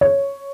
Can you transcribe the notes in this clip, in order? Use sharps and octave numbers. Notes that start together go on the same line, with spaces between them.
C#5